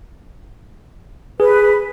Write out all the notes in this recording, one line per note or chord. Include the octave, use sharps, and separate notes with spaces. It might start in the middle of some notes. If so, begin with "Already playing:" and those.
G#4 B4